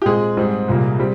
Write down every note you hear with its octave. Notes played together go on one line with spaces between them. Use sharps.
G4
A#2 G#3 C4 G#4
G#2 G3 C4
C2 A#2 G3 A#3
G3 C4